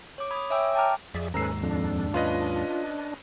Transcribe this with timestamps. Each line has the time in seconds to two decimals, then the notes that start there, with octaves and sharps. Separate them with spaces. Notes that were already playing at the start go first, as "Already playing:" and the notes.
0.18 C#5 D6
0.31 B5 D#6 G#6
0.50 C#5 E5 G5 G#5 D6 E6
0.75 G5 A5 A#5 D6 F6
1.14 F2 G#4 D5 E5
1.34 D#2 G#2 C#4 A4 B4 A#5 E6 C7
1.63 F2 D4
2.14 C#4 F4 B4 D#5